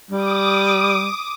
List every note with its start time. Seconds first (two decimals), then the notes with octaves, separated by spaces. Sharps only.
0.11 G3 D6 D#6